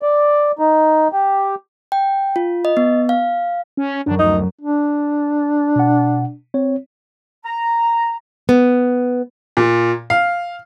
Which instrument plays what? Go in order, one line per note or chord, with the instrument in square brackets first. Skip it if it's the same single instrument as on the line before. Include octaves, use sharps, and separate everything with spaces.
[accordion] D5
D#4
G4
[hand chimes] G5
F4
D#5
B3
F5
[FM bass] C#4
[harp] F#2 F#3 [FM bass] D4
[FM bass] D2 [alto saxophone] D#4
[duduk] D4
[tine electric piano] B2 F#5
C4 C#5
[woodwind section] A#5
[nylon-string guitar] B3
[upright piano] A#2
F5